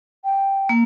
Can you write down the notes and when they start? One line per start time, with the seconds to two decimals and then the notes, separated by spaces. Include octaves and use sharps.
0.25 G5
0.69 A#3